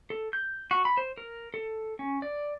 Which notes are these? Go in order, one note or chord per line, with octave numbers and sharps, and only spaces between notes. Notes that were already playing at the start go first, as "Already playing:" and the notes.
A4
G6
F#4
B5
C5
A#4
A4
C#4
D5